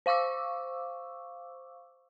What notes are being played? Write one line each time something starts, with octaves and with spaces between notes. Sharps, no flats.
C5 F5 C#6 D6 E6